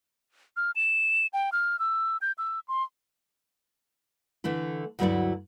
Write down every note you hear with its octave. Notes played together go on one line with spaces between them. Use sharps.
F6
E7
G5
F6
E6
G6
E6
C6
D3 E3 A3 E4
D2 G2 F#3 E4 D5 F#5